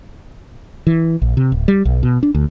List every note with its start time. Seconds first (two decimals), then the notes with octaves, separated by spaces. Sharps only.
0.87 E3
1.22 A#1
1.37 C3
1.52 D1
1.68 G3
1.85 B1
2.03 B2
2.23 D4
2.35 D2